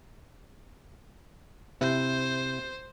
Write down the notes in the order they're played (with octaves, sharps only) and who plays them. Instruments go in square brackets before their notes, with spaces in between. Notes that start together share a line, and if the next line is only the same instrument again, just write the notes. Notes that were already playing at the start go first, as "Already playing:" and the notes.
[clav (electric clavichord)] C3 E4 [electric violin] C5